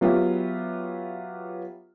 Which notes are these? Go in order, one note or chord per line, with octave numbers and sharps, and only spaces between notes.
F#3 B3 F4 G4 E5